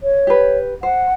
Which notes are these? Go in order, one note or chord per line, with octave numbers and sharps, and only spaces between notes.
C#5
G4 B4
C5 F#5